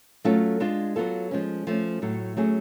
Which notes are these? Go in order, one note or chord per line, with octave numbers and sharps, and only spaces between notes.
F#3 A3 C#4 F4 A4
G#3 D4 F4
F#3 B3 F4 A4
F3 G#3 C#4
F3 A3 C#4
A2 F#3 A3
F#3 A3 C#4 G#4